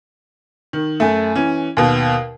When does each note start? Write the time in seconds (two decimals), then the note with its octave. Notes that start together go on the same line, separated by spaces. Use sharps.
0.73 D#3
1.00 F#2 A3
1.35 E3 C#4
1.77 D#2 B2